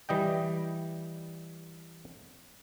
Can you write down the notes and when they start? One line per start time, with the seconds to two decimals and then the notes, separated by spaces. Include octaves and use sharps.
0.09 E3 G3 D#5 G5